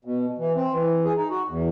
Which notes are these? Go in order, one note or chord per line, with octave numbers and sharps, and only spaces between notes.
B2
E3
C4
E3
G#4
D#4
F#4
E2